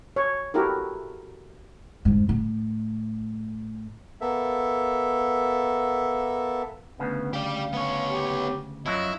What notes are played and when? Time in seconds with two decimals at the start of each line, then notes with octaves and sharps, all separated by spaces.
0.16 C#5
0.54 E4 F#4 G4 A4 A#4
2.05 F2 G#2
2.29 A2
4.21 A#3 B3 A4 E5
6.99 D2 C#3 B3
7.33 G4 D5 F5
7.73 B3 C#5
8.08 G4
8.86 F#2 F3 F#3 E4 D#5